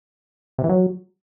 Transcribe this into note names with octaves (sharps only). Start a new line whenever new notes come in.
C3
E3
F#3